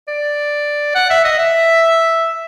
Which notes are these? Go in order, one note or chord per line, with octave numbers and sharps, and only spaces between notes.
D5
F#5
E5
D#5
E5